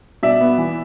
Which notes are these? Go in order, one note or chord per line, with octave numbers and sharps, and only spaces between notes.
B2 D5 E5
B3
E3